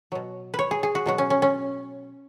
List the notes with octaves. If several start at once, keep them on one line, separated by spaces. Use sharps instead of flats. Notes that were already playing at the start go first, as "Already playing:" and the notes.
B2 F#3
B4
C#5
G#4
G#4
F#4
B2 F#3 F#4
C#4
C#4
C#4